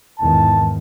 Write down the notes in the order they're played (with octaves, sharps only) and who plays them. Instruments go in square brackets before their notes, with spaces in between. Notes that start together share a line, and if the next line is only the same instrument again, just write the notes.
[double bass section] E2 G#2 D#3 [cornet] A5